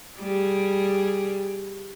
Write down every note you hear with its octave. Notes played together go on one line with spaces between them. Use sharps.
G3 G#4